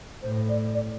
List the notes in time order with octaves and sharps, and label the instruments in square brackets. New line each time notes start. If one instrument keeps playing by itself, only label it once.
[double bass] A2 [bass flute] C5
[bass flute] D5
D5